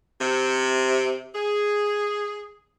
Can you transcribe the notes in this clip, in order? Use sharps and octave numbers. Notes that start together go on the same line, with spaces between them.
C3
G#4